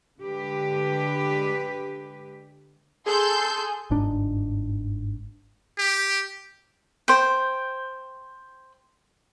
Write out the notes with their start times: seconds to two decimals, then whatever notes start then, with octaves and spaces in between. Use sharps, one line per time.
0.19 D3 G#3 G4 B4
3.06 G#4 A4 C6 G6
3.90 G1 G#2 D4
5.78 G4
7.08 C5 G5